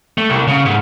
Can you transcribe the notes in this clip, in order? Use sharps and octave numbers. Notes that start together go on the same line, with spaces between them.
A3
C2
C#3
G#2